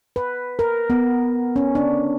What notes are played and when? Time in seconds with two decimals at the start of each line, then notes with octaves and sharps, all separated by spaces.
0.16 B4
0.59 A#4
0.90 B3
1.56 C#4
1.75 D4